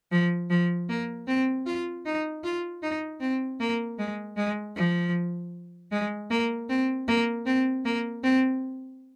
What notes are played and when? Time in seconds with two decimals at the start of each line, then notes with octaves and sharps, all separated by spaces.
0.12 F3
0.50 F3
0.89 A#3
1.27 C4
1.66 F4
2.06 D#4
2.44 F4
2.82 D#4
3.20 C4
3.60 A#3
3.99 G#3
4.37 G#3
4.76 F3
5.92 G#3
6.30 A#3
6.69 C4
7.08 A#3
7.46 C4
7.85 A#3
8.23 C4